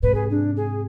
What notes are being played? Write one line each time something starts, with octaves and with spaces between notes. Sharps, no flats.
G#2 C3 B4
G#4
D4
G#4